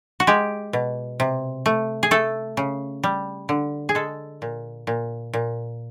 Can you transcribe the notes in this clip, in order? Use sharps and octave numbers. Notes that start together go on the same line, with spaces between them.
F#4
G#3 G4
B2
C3
A3
G#4
A3 A4
C#3
G3
D3
G#4
G#3 A4
A#2
A#2
A#2